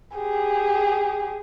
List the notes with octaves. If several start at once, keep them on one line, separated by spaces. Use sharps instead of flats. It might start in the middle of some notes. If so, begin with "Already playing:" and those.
G4 G#4